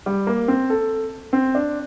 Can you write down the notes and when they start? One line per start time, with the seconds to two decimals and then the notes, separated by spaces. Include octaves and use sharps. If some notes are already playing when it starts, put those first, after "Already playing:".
0.06 G3
0.27 A#3
0.48 C4
0.70 A4
1.33 C4
1.55 D4